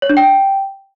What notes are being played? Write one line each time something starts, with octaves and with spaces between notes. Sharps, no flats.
C#5
D4
G5